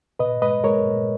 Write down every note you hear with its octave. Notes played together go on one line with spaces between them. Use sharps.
A#2 B4 D#5
G#3 B4 D#5
G#3 A#4 C#5
A#2